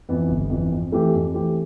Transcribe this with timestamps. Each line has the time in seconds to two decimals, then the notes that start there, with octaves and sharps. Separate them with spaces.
0.09 F2 E3 B3
0.29 G1
0.50 F2 E3 B3
0.72 F2
0.92 E3 A3 C4 G4
1.14 F2
1.34 E3 A3 C4 G4